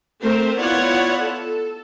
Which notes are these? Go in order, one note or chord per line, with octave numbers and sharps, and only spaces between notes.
A3 C4 A#4 C5
B3 E4 F4 C#5 D5 F#5
A4